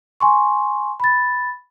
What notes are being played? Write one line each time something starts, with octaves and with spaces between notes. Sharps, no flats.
G#5 C6 C#6
B5 A6